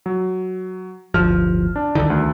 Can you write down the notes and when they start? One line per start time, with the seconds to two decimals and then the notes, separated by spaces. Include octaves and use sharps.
0.06 F#3
1.14 D1 G1 F3 F6
1.76 D4
1.95 C2 D3 D#3
2.10 D2